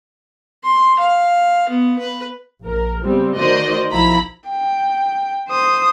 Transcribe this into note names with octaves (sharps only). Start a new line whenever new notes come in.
C6
F5
B3
B4
A#1 A#4
C#3 G3 B3 C4
D#3 A3 F#4 C5 D5 D#5
B1 F3 E4 A#5 B5 B6
G5
C5 D#6